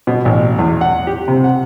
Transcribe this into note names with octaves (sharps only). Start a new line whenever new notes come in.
B2
A1
E2
F#5
G4
C3
F#5